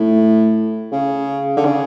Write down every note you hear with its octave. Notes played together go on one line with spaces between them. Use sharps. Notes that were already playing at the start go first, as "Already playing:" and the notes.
Already playing: A2
C#3
D3
C#3